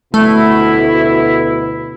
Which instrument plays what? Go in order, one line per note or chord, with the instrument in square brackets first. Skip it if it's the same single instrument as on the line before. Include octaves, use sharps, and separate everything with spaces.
[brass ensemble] D2 B2 E4 [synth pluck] A3